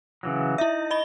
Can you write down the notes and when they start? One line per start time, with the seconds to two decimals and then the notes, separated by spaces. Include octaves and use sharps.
0.23 C#3 E3 F#3
0.58 D#4 E4 E5
0.91 D#5 B5 G7